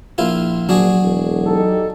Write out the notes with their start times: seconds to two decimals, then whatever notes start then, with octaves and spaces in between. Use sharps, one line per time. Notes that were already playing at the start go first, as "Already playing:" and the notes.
0.18 A#1 E4 F4
0.69 A#1 F#3 D4 F#4 G#4
1.01 E1
1.44 D#4 G4 A4